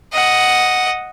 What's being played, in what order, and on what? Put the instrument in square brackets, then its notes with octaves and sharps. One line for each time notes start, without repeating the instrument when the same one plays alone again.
[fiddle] D#5 F#5